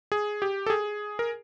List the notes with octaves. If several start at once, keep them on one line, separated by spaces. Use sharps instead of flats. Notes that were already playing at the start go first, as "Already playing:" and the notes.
G#4
G4
A4
G#4
A#4